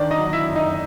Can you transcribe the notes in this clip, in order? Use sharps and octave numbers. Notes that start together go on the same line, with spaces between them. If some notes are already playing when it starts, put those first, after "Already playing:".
Already playing: D#3 D4 D5
D#4 D#5
F#3
E4 E5
F#2
D#4 D#5